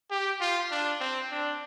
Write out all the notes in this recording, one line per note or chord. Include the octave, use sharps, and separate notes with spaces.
G4
F4
D4
C4
D4